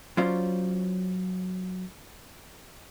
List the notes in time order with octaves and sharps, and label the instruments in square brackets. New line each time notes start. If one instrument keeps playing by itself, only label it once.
[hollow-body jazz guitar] F#3 C#4 F4 C5 D5